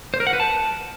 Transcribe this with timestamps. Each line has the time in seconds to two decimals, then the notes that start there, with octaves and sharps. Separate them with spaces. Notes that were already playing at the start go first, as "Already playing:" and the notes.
0.14 C5
0.20 A#4
0.27 F#5
0.33 B4
0.40 A5